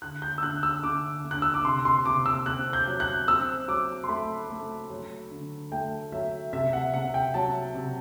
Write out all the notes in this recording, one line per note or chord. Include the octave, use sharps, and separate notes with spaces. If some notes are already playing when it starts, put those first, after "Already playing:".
D3 F#6
G6
E6
D3 F#6
E6
D3 D6
D3
F#6
E6
D6
C3 C6
C6
C3 D6
E6
C4 F#6
G6
F#3
F#6
C4 E6
F#3 D6
C6
A3 B5
A3
F#3
D3
A3 G5
F#3 E5
C3 E5
F#5
C3 F#5
G5
F#3 A5
C3